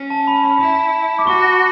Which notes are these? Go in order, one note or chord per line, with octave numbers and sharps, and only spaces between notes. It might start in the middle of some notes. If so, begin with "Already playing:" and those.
Already playing: C#4
A5
B5
B5
E4
D6
F#4 C#6